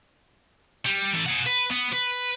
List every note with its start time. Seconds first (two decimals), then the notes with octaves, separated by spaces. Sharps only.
0.85 G3
1.13 E3 A4
1.26 G#4 F#5
1.46 B4
1.71 B3
1.93 B4